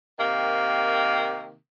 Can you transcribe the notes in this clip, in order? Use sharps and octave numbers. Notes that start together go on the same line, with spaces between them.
C3 D#3 A#3